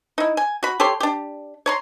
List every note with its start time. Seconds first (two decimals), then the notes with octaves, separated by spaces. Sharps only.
0.18 D#4 E4
0.37 G#5
0.63 F#4 B5
0.80 G4 A4 C#5 C6
1.00 D4 G4
1.66 C#5 A#5 C6